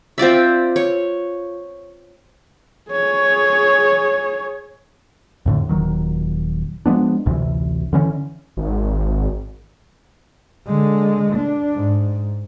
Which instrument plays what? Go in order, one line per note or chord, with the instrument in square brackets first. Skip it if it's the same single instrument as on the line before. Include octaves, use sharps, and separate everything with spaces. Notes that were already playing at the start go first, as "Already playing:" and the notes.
[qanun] C4 F4 D5 E5
C#5
[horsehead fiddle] G#4 C#5
[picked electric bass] F2 A2 D3
D#1 D#2 D#3 F#3
F3 G#3 B3 D4
A1 D2 C3 E3
D3 E3 C#4
[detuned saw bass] G#1
[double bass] D3 G#3
D4
G#2